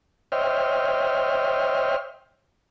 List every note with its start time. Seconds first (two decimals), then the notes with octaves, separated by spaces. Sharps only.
0.32 C5 C#5 D#5 E5 G5 F6